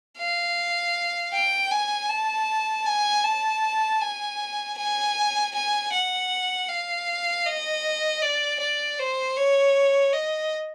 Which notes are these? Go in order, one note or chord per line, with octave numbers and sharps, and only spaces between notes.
F5
G5
G#5
A5
G#5
A5
G#5
G#5
G#5
F#5
F5
D#5
D5
D5
C5
C#5
D#5